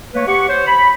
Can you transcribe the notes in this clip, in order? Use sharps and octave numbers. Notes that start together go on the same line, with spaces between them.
A3 A#3 B4 C#5
G4 F#5 C#6
C5 C#5
B5